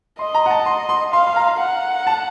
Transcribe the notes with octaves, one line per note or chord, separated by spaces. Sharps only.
D#5 C6
A#5
F#5
A5
C6
C6
F5 C6
C6
A#5
F#5
A5